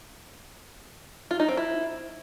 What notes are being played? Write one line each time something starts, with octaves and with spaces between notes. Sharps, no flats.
F4
D#4
C4
E4